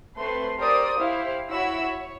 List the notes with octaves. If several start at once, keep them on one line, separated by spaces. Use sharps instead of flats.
A3 C4 B4 C6
G4 A#4 C5 D5 D#6
E4 G4 C5 F5
E4 F#4 C#5 B5 E6
C#5